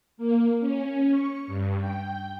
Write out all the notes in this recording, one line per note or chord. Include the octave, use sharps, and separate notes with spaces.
A#3
C#4
C#6
G2
G5